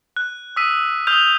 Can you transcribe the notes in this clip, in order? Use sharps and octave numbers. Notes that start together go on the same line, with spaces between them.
F#6
D#6 E6 B6 D#7
D#6 F6 G6 F7